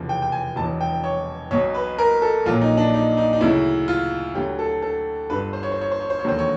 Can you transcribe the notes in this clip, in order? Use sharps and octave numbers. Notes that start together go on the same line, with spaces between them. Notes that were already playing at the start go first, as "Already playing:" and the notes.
Already playing: F1 E2 C#3 F3
G5
G5
G#5
E1 E2 B2 F#3 A5
G5
C#5
B1 B2 F#3 C#5
B4
A#4
A4
A#1 A#2 F#3 F4
D#4
D4
D#4
D#4
D#4
D2 C#3 F#3 E4
F4
D2 D3 F#3 G4
A4
A4
G1 G2 D3 B4
C5
C#5
C5
C#5
C5
C#5
C5
C#5
E1 D#2 D3 F#3 C5
C#5